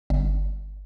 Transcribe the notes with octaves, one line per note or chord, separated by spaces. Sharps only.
G1